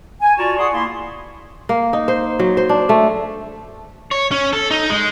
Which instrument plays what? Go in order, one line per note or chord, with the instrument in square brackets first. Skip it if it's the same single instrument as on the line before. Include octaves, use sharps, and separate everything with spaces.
[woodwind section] G#5
F4 F#4 D5 A5 A#5 C#6
G#4 D5 F#5 C6 C#6 D#6
A#3 E4 C6
[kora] A#3
D#4
C5
F#3
C5
D4
A3
[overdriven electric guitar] C#5
C#4
A4
D#4
G#3